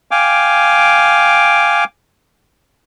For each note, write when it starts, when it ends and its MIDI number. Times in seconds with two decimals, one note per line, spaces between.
0.11 1.84 77
0.11 1.84 79
0.11 1.84 80
0.11 1.84 86